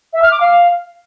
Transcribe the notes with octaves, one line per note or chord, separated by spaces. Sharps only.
E5
F6
D6
F5